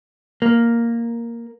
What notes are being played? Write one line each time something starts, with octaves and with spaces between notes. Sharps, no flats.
A#3